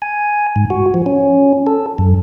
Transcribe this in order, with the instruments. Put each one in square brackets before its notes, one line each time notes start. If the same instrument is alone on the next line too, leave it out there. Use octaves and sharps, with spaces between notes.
[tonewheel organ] G#5
G#2
F#4
F3
C#4
A4
F#2